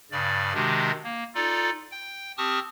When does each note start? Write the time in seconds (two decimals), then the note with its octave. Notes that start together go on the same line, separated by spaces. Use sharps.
0.11 G2 C#3 D5
0.54 C3 D#3 G#3 D4 F#4 G4
1.04 A#3
1.35 D#4 F4 A4 D5
1.92 G5
2.38 C4 G4 A5 C#6 D#6 F6